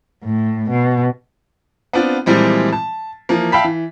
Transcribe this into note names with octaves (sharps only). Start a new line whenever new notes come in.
A2
B2
B3 C4 D4 F4
A#2 E3 F3 G3 G#3 C4
A5
E3 F3 A#3
E5 F5 G5 A5 B5 B6
E3